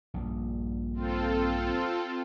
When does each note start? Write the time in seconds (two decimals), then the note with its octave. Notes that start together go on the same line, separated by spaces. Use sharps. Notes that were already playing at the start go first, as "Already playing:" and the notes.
0.14 A#1 G2
0.94 C4 F4 A4